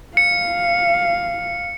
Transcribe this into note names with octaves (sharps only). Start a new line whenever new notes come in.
F5 C#7